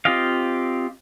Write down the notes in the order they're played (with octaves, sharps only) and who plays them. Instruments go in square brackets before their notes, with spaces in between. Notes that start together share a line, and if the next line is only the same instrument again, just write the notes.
[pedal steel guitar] C4 F4 G4 D#5 F5